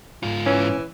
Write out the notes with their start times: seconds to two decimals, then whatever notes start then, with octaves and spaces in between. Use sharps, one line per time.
0.23 G#2 F4
0.46 E3 C#4